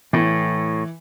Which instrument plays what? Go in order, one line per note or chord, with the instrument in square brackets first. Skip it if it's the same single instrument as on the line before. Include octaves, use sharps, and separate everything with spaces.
[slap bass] A2 [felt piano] E3